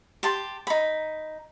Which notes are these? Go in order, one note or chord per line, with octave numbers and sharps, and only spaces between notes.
G4 A5 C6
D#4 B5